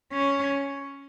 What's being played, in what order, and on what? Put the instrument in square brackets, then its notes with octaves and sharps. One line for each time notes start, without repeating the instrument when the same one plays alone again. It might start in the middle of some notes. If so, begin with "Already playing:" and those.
[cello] C#4